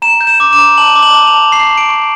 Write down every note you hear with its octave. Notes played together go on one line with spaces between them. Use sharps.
A#5 E7
G6
E7
D6
E7
A#5
A5 F#7
D6
F#7
A5
F7
A5
C#6 C7
C#6
D7
C#6